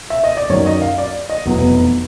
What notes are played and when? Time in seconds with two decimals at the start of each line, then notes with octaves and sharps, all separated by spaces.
0.10 E5
0.24 D#5
0.37 D5
0.49 F#2 D#3 F#3 C#5
0.66 D#5
0.82 F5
0.98 D5
1.30 D#5
1.46 F1 E2 B2 F#3 B3